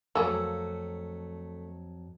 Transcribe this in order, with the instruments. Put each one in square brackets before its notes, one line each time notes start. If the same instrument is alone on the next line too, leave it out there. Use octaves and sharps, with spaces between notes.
[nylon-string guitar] F2 F#3 [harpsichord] A3 [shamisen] A#3 G#4 [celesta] E6